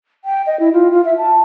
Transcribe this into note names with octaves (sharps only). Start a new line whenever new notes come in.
G5
D#5
E4
F4
F4
E5
A5